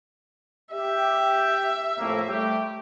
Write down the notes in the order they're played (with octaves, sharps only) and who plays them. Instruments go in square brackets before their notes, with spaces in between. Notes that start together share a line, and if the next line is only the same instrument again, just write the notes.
[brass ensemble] G4 [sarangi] E5
[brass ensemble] F2 A2 A#3
G3 A3 G4